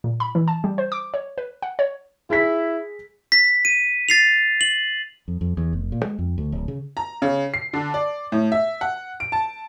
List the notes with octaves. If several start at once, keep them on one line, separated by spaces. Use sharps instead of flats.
A#2
B5
E3
A5
G3
C5
D6
C#5
B4
F#5
C#5
E4 G#4 B6
B6
D#7
A6 C7 F7
F#7
F2
F2
E2
F1
A#2
G#3
F2
D2
D1
C#3
A#5
C#3
C7
D3
D5
A2
E5
F#5
D7
A5